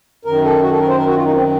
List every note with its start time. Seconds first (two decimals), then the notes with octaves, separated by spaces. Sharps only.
0.25 F#2 D#3 A#4
0.44 A4
0.62 F#4
0.71 A4
0.79 A#4
0.88 C5
0.97 A#4
1.07 F#4
1.16 F4
1.24 D#4
1.33 C4